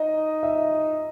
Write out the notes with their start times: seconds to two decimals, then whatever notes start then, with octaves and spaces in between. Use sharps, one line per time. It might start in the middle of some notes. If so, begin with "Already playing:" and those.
Already playing: D#4 D#5
0.43 E5